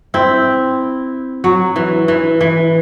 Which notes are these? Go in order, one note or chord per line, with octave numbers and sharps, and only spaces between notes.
C4 E4
F#3
E3
E3
E3